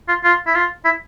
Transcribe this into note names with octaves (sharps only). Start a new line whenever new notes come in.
F4
F4
E4
F4
E4